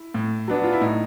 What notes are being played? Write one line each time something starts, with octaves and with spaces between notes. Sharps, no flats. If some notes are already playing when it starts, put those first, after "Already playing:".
Already playing: E4
A2
F#3 B3 D4
F4
E4
A2 D#4